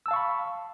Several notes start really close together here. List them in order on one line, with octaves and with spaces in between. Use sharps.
E6 A5 F5 C#6 B5